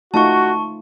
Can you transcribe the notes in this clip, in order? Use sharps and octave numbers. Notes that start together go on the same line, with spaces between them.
A3 D#4 F4 F#4 A5 C#6